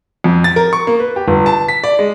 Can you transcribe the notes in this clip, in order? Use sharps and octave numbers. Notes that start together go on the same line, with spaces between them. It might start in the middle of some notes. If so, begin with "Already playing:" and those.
F2
A6
A#4
C#6
A#3
B4
G4
G1
A5
B6
D5
G#3